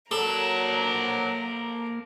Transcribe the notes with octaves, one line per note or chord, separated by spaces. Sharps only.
F#3 A#3 A4 A#4 A5